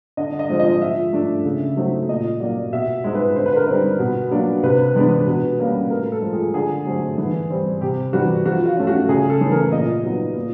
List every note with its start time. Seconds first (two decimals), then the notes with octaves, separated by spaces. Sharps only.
0.17 D3 D#5
0.39 D#5
0.49 F3 G#3 C4
0.59 D#5
0.81 F3 E5
1.13 A3 D4
1.45 C#3
1.77 F#3 A3 C4 D#4
2.09 A#2 D#5
2.40 F#3 A#3 D5
2.72 B2 E5
3.04 G#3 C4 D#4
3.15 B4
3.36 D3 C5
3.46 B4
3.56 A#4
3.66 G3 C4 D#4 B4
3.99 B2
4.31 F#3 A#3 D4
4.63 C3 B4
4.95 E3 G#3 B3 D4
5.27 B2
5.59 G3 A#3 C#4
5.90 A2 A#4
6.12 A4
6.22 F3 G#3
6.33 G#4
6.54 D3 G#4
6.86 F#3 A3 C4
7.18 E3
7.50 G3 C4
7.81 C3 G4
8.13 E3 G3 F#4
8.45 F3 F#4
8.66 F4
8.77 A3 C#4
8.87 F#4
9.09 C#3 G#4
9.30 A4
9.41 E3 A3 C#4
9.52 A#4
9.72 A#2 D#5
10.04 F#3 B3 D#4
10.36 A#2